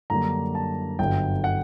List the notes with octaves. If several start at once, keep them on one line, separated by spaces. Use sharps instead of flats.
F#2 D3 G3 A#3 D4 A#5
A5
G1 F#2 D3 F#3 G5
F#5